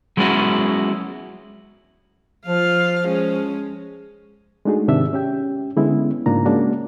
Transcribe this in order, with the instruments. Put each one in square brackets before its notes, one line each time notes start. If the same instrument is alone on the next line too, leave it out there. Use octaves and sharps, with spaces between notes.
[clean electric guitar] F#3 G#3 B3 C#4 E4 F#4
[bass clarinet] F3 [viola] F4 F5
[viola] G#3 C#4
[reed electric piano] G#3 A3 D4 D#4 F#4 G#4
G#2 C3 D#3 D4 E5
C#4 G4 G5
D3 G#3 B3 C#4 E4
G#2 C#3 A#3 D4 F4 A#5
G#3 A#3 C#4 D4 F#4